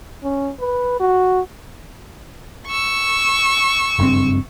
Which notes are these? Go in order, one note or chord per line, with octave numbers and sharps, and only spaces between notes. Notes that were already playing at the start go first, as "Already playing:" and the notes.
C#4
B4
F#4
C#6 E6
F#1 G2 C4